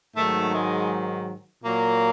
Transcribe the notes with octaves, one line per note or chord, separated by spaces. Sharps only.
G#2 D#3 F#3 A3
G#3
A#2 F#3 A#3